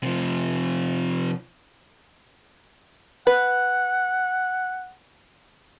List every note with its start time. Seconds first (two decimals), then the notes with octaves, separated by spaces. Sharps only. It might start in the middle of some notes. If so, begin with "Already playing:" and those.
0.03 C3 F3
3.27 B4 F#5